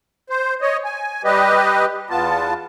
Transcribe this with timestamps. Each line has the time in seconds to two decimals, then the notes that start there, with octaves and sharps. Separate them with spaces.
0.30 C5
0.61 C#5 D#5
0.85 G#5
1.24 G3 G4 B4 D#5
2.10 E2 B3 F4 A5